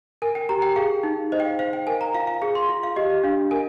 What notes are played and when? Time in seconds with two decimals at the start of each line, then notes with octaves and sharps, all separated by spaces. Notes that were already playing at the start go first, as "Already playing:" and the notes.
0.22 A#4 G#5
0.35 G5
0.49 G4 A#5
0.62 G5
0.76 G#4 F5
1.03 D#4
1.32 C5 D#5
1.40 G5
1.45 F5
1.59 C5 F5
1.73 G5
1.87 A#4 G#5
2.01 A#5
2.14 F4 F5
2.27 F5
2.42 G#4 F5
2.55 C6
2.69 F4
2.83 F5
2.96 G4 D#5
3.10 D#5
3.24 D4 F5
3.51 A#4 G#5